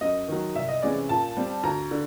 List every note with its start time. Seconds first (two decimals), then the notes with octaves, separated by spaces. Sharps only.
0.01 F#2 D#5
0.28 D#3 F#3
0.55 C2 E5
0.68 D#5
0.82 C3 E3 G#3 C#4 D5
1.09 A#2 A5
1.37 G3 C4
1.63 D2 A#5
1.91 D3